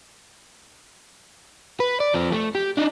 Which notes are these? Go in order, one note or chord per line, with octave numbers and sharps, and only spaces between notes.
B4
D5
F3 C4
A3
G4
D4 D#4